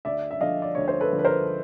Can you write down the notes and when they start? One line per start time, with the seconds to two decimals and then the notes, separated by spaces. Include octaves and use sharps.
0.05 D2 D5 E5
0.31 E5
0.41 D3 F3 D#5 F5
0.62 D5
0.75 D2 C#5
0.88 C5
1.00 A4 B4
1.13 D3 F3
1.19 B4
1.25 A#4 C5